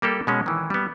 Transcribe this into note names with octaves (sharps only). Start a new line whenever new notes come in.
G3 A#3 G4 A4
B2 G#3 C#4
D#3 E3
G3 B3